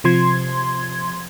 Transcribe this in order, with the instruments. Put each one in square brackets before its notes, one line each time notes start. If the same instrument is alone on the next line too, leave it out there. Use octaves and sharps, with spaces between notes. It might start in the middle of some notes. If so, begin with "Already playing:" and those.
[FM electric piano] C3 F3 C6 G#6